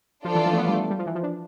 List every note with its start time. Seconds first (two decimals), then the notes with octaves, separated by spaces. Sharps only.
0.24 F3 D4 F4 A4 D5
0.35 E3
0.46 F3
0.53 A3
0.58 B3
0.68 G3
0.73 A3
0.90 G3
0.99 F3
1.06 E3
1.15 F3
1.23 D4